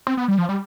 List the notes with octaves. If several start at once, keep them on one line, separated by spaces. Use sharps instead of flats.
C4
B3
G3
F3
G3